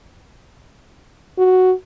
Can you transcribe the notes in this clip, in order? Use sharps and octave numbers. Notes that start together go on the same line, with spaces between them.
F#4